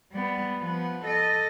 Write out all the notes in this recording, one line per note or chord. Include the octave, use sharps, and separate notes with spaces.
G3 B3
F3 B3
A4 D#5